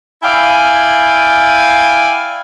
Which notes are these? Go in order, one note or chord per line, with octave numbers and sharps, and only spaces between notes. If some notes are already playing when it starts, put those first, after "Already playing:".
E4 D5 F5 G5 G#5